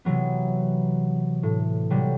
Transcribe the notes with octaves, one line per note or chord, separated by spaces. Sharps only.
C3 E3 F#3 B3
A2
C3 F#3 G3